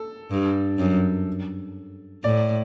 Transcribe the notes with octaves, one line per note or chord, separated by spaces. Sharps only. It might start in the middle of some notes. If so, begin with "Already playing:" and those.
Already playing: A4
G2
F#2
A2 D5